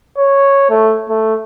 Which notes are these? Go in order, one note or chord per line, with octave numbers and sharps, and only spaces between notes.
C#5
A3
A3